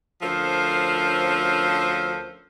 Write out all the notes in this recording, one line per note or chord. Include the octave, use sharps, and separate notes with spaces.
D2 F3 C#4 A4 A#4 C5